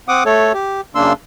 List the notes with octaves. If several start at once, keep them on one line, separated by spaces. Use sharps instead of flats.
C4 F#5 D6 D#6
A3 A4 C#5
G4
F#2 C#3 A#3 D4 C6 E6